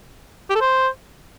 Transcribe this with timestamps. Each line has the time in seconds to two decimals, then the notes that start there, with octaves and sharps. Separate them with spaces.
0.50 G4
0.55 A4
0.61 C5